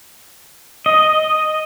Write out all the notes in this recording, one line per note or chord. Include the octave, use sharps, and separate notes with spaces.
D#5